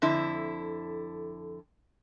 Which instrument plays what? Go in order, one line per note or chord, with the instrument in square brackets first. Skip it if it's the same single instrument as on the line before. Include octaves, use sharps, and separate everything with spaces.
[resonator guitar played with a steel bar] F2 D3 E4